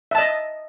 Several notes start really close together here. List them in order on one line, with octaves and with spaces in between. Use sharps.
E5 A5 D#5